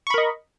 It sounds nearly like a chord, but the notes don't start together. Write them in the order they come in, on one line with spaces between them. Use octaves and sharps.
C#6 B5 A#4 D#5